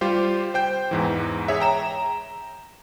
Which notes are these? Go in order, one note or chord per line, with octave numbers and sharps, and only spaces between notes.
G3 F4 G4 C5
C5 G5 G6
E2 G#2 E3
G#4 C#5 E5
G5 A#5 E7